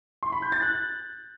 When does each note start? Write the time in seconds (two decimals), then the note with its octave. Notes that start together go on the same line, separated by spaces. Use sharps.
0.23 C6
0.32 B5
0.42 G6
0.52 A6
0.62 F#6